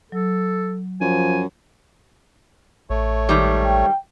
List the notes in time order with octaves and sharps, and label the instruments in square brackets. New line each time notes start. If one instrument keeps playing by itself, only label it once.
[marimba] F#3 [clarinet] A4
[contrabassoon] F#2 [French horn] F3 [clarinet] G#5
[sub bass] A1 [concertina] A3 C#5
[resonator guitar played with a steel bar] G#2 D#3 G3
[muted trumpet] G5